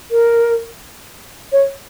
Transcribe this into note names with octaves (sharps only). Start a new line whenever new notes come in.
A#4
C#5